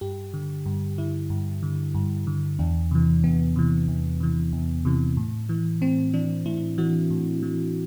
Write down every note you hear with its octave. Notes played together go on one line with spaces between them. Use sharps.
G2 G4
D3
G2
D3 E4
G2
D3
G2
D3
E2 D4
C3 E3
E2 B3
C3 E3
E2
C3 E3
E2
C3 E3
A2
E3
A2 C4
E3 D4
A2 E4
E3 F#4
A2
E3